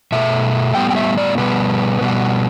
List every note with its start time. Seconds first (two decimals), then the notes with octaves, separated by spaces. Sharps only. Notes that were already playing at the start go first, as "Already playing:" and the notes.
0.12 B2 A3 E5
0.75 A2 G3 B3 G5
0.91 G5
0.96 E5
1.18 D5
1.38 B2 G3 B3 B4
2.01 B2 G3 B3